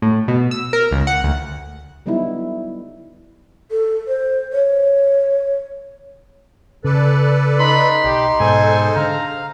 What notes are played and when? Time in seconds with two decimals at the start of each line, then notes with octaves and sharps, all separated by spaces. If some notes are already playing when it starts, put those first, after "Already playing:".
0.02 A2
0.28 B2
0.51 E6
0.73 A#4
0.91 C#2
1.07 F#5
1.23 D2
2.06 D3 F#3 G3 B3 D#4 E4
3.71 A4
4.08 C5
4.53 C#5
6.84 C#3 A4 B4 D5
7.59 D#4 B5 C6
8.04 B1 G4
8.40 G#2 B2 G#3 A4 C5 G#5
8.96 D3 F5 A#5